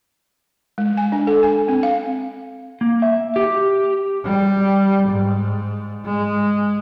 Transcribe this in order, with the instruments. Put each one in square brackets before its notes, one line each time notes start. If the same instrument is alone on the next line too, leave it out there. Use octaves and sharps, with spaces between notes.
[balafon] G#3
G#5
D4
A4
G#5
C4
F5
[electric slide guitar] A#3
E5
G4
[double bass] G3
G#2
G#3